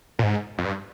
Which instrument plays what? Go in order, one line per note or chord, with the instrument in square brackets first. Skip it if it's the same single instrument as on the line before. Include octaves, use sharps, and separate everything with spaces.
[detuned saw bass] A#2
G#2
F2
G2